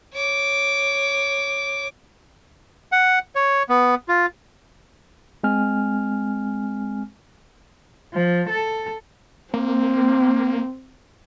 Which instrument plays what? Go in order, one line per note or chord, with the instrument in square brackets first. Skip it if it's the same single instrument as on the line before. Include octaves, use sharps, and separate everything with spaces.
[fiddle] C#5 D6
[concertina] F#5
C#5
B3
F4
[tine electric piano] G#3 C4 G#5 F6
[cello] F3
A4
[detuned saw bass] A#3 [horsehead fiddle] C4